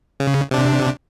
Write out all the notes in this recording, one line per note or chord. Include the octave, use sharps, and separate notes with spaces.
C#3
C3 D4